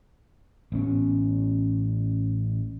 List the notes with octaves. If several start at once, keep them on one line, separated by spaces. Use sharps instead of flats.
A1 B3 C#4